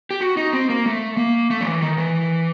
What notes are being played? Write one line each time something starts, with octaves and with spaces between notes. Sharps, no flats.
G4
F#4
D#4
C4
A#3
A3
A#3
A3
F3
E3
D#3
E3